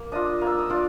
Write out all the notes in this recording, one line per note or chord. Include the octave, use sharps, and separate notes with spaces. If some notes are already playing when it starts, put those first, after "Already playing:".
Already playing: A#3
D4 F4 D#5 D#6
A#3
E6
D#6
D4 F4 D5 D6